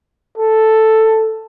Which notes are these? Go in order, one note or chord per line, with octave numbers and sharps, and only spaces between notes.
A4